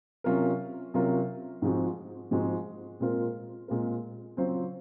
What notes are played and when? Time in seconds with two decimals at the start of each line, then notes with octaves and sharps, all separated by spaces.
0.24 C3 F#3 C#4 F4 A#4
0.94 C3 F#3 C#4 F4 A#4
1.62 G#2 F3 G#3 C4 F#4
2.31 G#2 F3 G#3 C4 F#4
3.00 A#2 G#3 C4 F4 A#4
3.68 A#2 G#3 C4 F4 A#4
4.37 C#3 F#3 C4 F4 C5